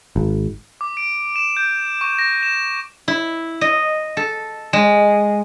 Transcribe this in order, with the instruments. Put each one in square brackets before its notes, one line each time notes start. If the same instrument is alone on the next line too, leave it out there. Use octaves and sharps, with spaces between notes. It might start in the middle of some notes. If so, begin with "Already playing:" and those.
[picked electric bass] G#1
[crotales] D6
D7
E7
G6
C#6
A#6
E7
[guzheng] E4
D#5
A4
G#3